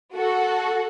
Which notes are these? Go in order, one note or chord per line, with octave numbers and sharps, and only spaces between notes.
F#4 A4